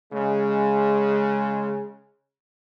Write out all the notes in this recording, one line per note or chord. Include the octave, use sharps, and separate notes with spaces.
C#3 G#3